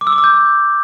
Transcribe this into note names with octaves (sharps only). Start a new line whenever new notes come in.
D6
E6
D6
E6
G6